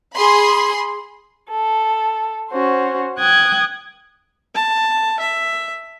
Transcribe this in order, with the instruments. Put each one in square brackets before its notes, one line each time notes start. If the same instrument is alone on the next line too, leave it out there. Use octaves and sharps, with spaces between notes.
[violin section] G#4 B5 C6
[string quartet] A4
C#4 F#4 C5
G5 D#6 F#6 G#6
[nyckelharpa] A5
E5